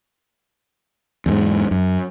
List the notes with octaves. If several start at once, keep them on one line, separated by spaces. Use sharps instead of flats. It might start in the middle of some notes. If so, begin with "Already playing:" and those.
E2 G#2
F#2